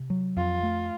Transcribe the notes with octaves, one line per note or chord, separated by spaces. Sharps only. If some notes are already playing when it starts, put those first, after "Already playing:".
Already playing: C3
F#3
F2 F4
A3